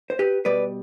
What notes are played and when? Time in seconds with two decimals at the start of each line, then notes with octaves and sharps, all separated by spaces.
0.10 C5
0.19 G4 B4
0.45 B2 G3 B4 D5